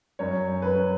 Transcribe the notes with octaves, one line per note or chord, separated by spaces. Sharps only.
F#2 C#5
F#2 B4